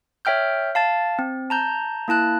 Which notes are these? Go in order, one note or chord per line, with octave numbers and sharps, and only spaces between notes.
C#5 E5 G5 F6 G6
F5 A5 A6
C4
A5 A#5 G6
A#3 E4 A5 F#6